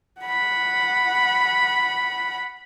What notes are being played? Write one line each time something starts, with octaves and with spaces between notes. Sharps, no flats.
F#5 B5